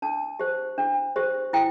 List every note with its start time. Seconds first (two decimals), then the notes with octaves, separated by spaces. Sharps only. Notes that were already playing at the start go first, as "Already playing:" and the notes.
0.02 D4 A5
0.39 G4 C5
0.78 D4
1.16 G4 C5
1.53 E4 G5